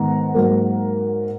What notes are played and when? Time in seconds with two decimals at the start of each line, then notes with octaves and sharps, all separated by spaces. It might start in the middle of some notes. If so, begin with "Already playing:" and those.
Already playing: G#2 D#3 B3 F#5 A#5
0.34 G#2 F#3 A#3